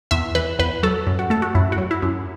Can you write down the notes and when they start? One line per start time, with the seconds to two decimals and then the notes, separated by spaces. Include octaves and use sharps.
0.11 E2 E5
0.35 E3 B4
0.59 E2 B4
0.83 F#3 A4
1.07 F#2
1.19 F#4
1.30 A3 A4
1.42 F#4
1.55 F#2 E4
1.72 F#4
1.78 F#3
1.91 E4
2.02 F#2